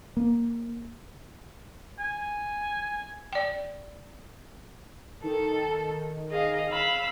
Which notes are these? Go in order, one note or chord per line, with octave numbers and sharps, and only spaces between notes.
A#3
G#5
D5 G5
D#3 A4
G#4 D#5 F5
F5 B5 E6